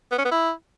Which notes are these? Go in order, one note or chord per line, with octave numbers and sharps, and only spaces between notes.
B3
C#4
B3
E4